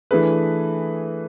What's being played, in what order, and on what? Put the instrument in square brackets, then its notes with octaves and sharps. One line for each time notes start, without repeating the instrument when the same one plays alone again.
[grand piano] E3 A3 D4 G#4 B4